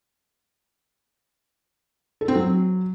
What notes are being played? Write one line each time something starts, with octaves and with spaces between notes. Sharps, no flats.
A4
C4
F#3